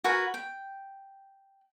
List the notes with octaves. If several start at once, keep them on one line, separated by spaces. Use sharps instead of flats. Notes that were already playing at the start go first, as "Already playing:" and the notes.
F#4 A#4 B4 G#5
G5